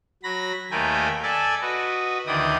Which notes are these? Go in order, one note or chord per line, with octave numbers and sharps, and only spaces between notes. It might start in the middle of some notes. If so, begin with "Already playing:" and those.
F#3 B5 A#6
D#2 A3 A#4 B4 G5 G#5
A4 D5 E5 G#5
F#4 B4 D#5
D2 D#3 E3 D5 G5 D#6